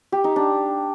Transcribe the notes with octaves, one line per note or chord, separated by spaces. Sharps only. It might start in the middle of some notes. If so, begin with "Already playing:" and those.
G4
D#4
D4